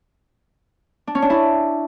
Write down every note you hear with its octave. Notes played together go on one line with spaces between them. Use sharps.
D4
C#4
D4
E4